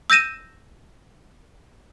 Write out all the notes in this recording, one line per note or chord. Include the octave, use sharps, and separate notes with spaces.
E6 G6 A#6 D#7 E7